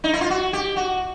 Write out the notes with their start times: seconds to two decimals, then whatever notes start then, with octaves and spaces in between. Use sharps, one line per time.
0.04 D#4
0.13 E4
0.21 F4
0.30 F#4
0.53 G4
0.76 F#4